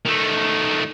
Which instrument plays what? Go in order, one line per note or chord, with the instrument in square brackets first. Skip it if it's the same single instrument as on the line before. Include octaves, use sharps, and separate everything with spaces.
[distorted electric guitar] D#3 A3